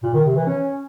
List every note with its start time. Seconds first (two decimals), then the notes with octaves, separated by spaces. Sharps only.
0.03 A#2
0.14 D#3
0.25 C3
0.36 E3
0.47 C#4